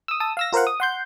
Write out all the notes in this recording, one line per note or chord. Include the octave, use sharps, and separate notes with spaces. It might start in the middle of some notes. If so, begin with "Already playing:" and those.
D#6 E6
A5 D#6 E6
F5 E6 A#6
F4 A#4 C5 F5 F#5
D#6
F#5 C6 G6